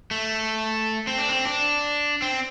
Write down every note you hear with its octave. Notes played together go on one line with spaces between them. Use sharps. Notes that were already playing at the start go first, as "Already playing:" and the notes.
A3
C4
D4
C4
D4
C4